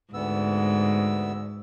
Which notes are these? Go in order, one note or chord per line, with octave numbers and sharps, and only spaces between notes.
D2 G#2 B3 E6